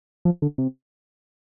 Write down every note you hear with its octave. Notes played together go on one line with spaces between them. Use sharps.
F3
D3
C3